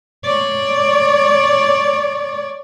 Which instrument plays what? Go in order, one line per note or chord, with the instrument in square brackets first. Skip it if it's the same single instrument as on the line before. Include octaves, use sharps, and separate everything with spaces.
[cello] C#5 D5